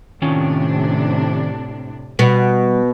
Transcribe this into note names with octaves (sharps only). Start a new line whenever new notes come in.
A2 C3 D#3 C#4 D4 F4
B2 G3 B3